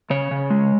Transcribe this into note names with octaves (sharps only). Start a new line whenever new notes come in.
C#3 C#5
C#3
G#3